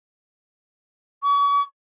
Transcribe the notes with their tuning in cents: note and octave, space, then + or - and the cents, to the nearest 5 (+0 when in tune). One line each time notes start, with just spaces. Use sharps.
C#6 +40